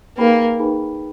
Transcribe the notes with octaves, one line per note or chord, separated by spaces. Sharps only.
A#3 D#4 G#4 B4 G5 B5
D#4 G#4 B4 G5 B5